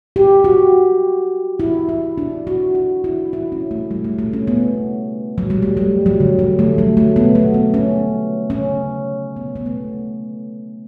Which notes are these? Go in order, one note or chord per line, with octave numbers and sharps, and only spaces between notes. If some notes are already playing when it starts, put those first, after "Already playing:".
G4
F#4
E4
E4
D4
F#4
F#4
E4
E4
C#4
A3
G3
A3
A3
C#4
B3
F#3
G3
A3
G3
F#3
D3
F#3
A3
F#3
A3
B3
A3
B3
C#4
C#4
B3
B3
A3